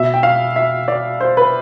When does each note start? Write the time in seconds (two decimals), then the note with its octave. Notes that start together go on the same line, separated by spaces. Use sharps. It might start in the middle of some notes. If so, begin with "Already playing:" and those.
Already playing: B2 E5
0.14 G5
0.23 F5
0.56 E5
0.88 D5
1.20 C5
1.37 B4